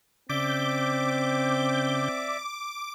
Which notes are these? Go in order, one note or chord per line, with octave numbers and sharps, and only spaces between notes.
C#3 C4 D5 E5 D6 G6